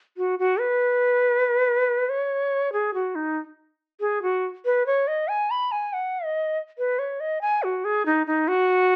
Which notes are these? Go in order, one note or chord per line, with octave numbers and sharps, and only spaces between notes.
F#4
F#4
B4
C#5
G#4
F#4
D#4
G#4
F#4
B4
C#5
D#5
G#5
B5
G#5
F#5
D#5
B4
C#5
D#5
G#5
F#4
G#4
D#4
D#4
F#4